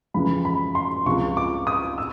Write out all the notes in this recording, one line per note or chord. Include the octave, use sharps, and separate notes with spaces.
F2 C#3 E3 G#3 B5
B5
C6
C#2 C3 F3 G#3 C#6
D6
D#6
E6